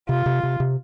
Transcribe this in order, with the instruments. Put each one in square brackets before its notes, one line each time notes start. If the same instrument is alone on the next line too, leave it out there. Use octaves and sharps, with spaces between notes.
[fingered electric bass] C3 [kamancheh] F4
[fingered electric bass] C3
C3
C3